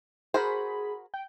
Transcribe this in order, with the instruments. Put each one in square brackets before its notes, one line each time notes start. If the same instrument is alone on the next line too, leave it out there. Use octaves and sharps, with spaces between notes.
[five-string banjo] F#4 A#4 C5 [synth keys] G#4 B5
[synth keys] G5